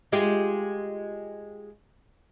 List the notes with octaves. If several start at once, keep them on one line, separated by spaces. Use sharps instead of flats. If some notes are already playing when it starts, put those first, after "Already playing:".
G#3 F4 G4